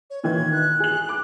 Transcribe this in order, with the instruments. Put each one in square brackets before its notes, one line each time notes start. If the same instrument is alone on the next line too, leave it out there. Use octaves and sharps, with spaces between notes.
[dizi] C#5
[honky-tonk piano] A#2 D#3 E3 [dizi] G#6
[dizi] F#6
[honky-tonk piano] G#4 F#7
D6